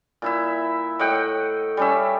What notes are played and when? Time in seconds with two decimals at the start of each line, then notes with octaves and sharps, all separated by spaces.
0.22 A#2 E4 E5
0.99 A2 D#5 F#5 G5
1.77 G3 C#4 E5